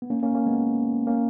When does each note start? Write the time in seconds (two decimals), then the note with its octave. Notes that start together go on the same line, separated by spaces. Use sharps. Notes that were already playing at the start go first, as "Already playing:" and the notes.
0.02 B3
0.10 A#3 C#4
0.23 A#3 C#4
0.35 A#3 C#4
0.47 G#3 B3
1.07 A#3 C#4